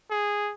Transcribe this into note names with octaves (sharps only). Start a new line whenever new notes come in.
G#4